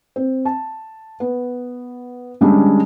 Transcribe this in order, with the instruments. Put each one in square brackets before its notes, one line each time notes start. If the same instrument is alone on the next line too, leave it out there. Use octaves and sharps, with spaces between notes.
[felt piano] C4
A5
B3
D3 G3 G#3 C#4 D4